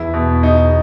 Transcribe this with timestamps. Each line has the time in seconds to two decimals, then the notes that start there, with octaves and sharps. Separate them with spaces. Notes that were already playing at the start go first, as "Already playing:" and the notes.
Already playing: E2 E4
0.14 B2
0.43 D#4